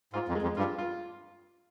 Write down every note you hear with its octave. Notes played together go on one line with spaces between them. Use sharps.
G#2 F4
F2
G#3
F2
G2 F4
F4